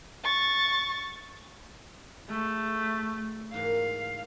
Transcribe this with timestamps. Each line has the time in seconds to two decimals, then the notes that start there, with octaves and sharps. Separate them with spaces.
0.23 C#6 A6
2.29 G#3 A3 A4
3.54 G#2 E3 A#3 F5